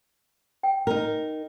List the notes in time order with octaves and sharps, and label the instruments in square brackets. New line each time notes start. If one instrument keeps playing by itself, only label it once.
[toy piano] G5
[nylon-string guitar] D#4 A#4